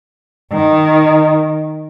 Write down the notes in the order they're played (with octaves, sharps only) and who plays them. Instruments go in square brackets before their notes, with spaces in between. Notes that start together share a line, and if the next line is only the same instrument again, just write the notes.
[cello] D#3